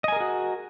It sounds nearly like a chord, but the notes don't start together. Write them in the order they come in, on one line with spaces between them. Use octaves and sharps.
D#5 G#5 A#4 G#4 F#4